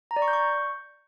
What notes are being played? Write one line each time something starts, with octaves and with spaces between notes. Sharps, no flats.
A#5
D5
C#6
G6
C#6